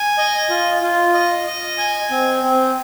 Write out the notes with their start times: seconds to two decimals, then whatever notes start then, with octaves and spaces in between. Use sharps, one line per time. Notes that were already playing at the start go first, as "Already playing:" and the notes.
Already playing: G#5
0.18 D#5
0.50 F4
0.82 F4
1.14 D#5
1.46 D#5
1.78 G#5
2.10 C4
2.43 C4